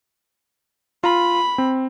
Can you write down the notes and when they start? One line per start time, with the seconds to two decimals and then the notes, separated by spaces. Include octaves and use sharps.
1.04 F4 B5
1.58 C4